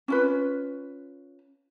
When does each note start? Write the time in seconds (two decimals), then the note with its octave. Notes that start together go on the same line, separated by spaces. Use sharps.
0.08 C#4 F4 B4